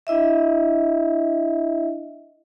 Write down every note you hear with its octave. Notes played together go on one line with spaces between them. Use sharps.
D4 E4 D#5 E5